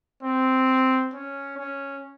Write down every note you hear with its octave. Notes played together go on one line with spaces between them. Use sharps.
C4
C#4
C#4